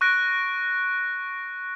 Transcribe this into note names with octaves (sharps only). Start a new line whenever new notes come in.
C#6 F#6 A#6 D7